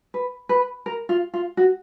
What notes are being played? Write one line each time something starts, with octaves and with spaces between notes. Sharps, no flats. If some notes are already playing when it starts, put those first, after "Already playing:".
B4
B4
A#4
F4
F4
F#4